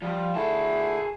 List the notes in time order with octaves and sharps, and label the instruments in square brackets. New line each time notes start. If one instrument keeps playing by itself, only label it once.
[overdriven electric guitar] F3 [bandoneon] G3
[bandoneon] D3 A3 E4 [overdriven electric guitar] G#4 A5